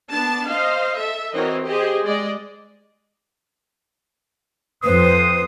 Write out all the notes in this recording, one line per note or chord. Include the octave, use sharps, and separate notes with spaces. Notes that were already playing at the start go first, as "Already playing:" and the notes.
B3 D4 A5
C5 D#5 F5
A4 E5
E3 C4 F#4 A#4 C#5 D#5
G4 G#4 C5 D#5
G#3 D5 D#5
F2 B4 C5 D#6